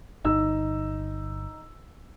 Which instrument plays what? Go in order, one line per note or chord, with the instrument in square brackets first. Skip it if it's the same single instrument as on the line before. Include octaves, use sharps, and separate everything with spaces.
[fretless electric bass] G1 [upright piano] D#4 E6